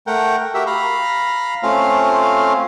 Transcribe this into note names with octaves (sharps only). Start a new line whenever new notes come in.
A3 A#4 F#5 G5
F#4 G4 A#4 E5
F5 A#5 B5
A3 C4 C#4 F4 F5